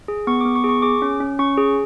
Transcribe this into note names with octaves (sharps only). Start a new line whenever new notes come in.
G#4
B3 C#6
D6
B3
C#6
G#4
C#6
G#4 D6
C#4
C#4
C#4 C#6
G#4